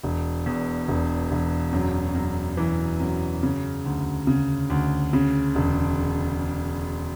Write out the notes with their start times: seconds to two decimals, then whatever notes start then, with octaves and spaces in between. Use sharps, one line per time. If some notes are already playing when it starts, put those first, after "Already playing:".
0.03 E1
0.46 E2
0.88 E1
1.31 E1
1.73 F#2
2.15 F#2
2.57 E3
3.00 F#2
3.43 C#3
3.85 D2
4.27 C#3
4.70 D2
5.13 C#3
5.55 E1